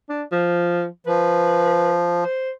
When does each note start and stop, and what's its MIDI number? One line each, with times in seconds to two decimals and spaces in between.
0.09 0.23 62
0.32 0.86 53
1.07 2.24 53
1.07 1.94 71
2.24 2.51 72